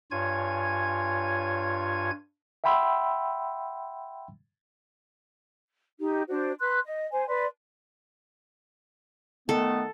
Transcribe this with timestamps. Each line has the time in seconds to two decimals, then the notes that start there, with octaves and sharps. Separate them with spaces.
0.11 G2 F4 C#5 G#5 G#6
2.64 E5 F#5 G5 B5 C6 E6
6.00 D#4 G4
6.29 D4 F#4 C5
6.60 B4 C6 F#6
6.85 D#5
7.12 C5 G#5
7.28 B4 D5 C6
9.49 D#3 A3 B3 A4